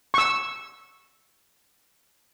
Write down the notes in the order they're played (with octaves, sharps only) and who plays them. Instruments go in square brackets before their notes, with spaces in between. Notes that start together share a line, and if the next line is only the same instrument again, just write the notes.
[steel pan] C#6 E6